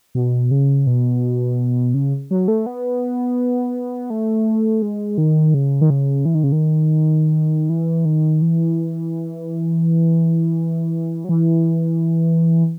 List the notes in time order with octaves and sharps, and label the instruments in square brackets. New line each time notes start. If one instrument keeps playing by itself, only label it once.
[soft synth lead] B2
C#3
B2
C#3
F#3
A3
B3
A3
G#3
D#3
C#3
D#3
C#3
E3
D#3
C#3
D#3
E3
D#3
E3
F#3
E3